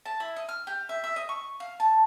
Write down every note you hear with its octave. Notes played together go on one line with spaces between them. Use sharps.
A5
E4
D#5
F6
G4
E5
E5
D#5
C#6
F5
A5